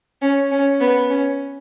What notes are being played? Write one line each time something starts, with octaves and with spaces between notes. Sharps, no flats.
C#4
C#4
B3
C#4